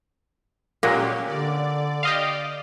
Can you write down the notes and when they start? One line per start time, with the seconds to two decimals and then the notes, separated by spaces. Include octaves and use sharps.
0.83 A#2 F#3 G#3 A#3 C#4 G4
1.27 D3 D5
2.03 G4 D#5 F5